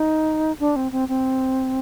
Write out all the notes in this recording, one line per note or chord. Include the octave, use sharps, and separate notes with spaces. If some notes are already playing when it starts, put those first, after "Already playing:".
Already playing: D#4
D4
C4
C4
C4